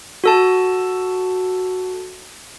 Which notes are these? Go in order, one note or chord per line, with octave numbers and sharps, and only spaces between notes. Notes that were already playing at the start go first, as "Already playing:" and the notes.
F#4 A4 A5